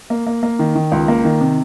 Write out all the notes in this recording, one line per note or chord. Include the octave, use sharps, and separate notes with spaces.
A#3
A#3
A#3
D#3
D#3
C#2
A#3
D#3
C3